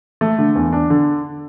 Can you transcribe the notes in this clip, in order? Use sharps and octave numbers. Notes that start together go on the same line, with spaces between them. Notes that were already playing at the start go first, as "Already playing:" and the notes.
A3
D3
E2
D4
D3